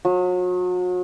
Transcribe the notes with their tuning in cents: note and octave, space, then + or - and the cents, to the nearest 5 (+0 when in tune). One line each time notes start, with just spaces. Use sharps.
F#3 -40